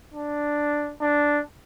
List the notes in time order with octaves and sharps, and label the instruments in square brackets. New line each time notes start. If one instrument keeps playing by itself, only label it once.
[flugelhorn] D4
D4